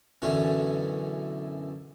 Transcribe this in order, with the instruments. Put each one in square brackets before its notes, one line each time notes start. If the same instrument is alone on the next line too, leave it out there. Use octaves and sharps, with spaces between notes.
[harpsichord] B1 F#2 D3 E3 C#4